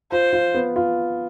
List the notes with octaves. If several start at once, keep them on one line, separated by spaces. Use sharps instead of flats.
F4 C5
F4
B3
F4